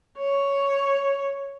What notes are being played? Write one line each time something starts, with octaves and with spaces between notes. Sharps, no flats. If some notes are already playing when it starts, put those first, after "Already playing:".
C#5